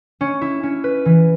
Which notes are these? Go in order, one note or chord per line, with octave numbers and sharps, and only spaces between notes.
C#4
E4
C#4
B4
E3